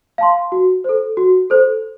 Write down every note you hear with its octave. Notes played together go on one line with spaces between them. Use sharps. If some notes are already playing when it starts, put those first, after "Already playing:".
F5 A5 C6
F#4
A4 C5
F#4
A4 C5